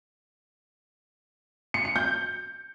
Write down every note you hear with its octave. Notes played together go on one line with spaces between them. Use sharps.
C#7
C#7
G6